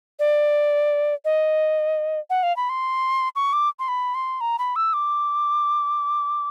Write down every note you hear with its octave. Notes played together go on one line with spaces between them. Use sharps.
D5
D#5
F#5
F5
B5
C6
C#6
D6
C6
B5
C6
A#5
B5
E6
D6